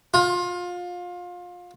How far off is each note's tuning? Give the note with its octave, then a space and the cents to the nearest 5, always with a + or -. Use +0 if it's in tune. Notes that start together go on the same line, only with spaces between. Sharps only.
F4 +25